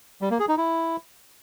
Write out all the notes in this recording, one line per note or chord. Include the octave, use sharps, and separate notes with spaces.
G3
A#3
G#4
D#4
E4